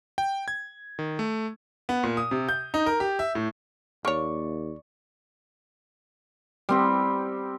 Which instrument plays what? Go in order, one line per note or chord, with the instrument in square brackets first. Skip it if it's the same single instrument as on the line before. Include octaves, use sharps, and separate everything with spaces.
[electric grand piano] G5
G#6
D#3
A3
[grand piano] B3
A#2
D#6
C3
G6
D#4
A#4
G4
E5
A2
[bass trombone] D#2 [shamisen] A#3 C#5 [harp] D5 C#6
[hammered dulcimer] G3 C4 G4